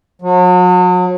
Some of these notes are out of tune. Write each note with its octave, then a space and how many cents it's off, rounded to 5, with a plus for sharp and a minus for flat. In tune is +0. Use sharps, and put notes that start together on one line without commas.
F#3 -40